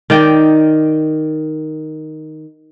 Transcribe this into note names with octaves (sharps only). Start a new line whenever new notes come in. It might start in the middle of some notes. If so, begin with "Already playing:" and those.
D#3 D5 G5